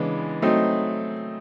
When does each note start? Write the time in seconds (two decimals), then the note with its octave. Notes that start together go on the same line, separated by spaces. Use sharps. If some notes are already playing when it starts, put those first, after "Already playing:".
Already playing: C#3 E3 G#3 B3 D4
0.42 F#3 A3 C4 D#4